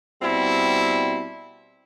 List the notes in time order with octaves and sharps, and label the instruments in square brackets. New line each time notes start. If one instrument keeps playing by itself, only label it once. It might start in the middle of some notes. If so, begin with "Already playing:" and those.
[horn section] B2 G3 C4 E4